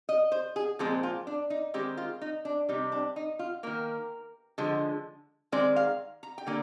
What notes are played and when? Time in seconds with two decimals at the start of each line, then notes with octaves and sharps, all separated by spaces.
0.09 D#5
0.32 C5
0.56 G#4
0.79 A#2 F3 G#3 C4 G#4
1.03 F4
1.27 D4
1.50 D#4
1.74 D#3 G#3 C4 G4
1.97 F4
2.21 D#4
2.45 D4
2.69 C3 G3 C4 D#4
2.92 D4
3.16 D#4
3.39 F4
3.63 D#3 A#3 A#4
4.58 D3 F3 G#3
5.52 D#3 G#3 C4 D5
5.76 F5
6.23 A#5
6.38 G5
6.47 D3 G3 A#3 G#5